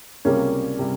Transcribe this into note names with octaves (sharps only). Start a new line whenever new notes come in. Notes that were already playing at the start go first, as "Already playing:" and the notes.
C#2 C3 G3 A#3 C#4
C3 G3